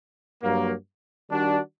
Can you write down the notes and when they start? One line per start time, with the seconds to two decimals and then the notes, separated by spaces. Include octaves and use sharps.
0.43 G2 F#3 A#3
1.29 D#3 G3 D4 F#4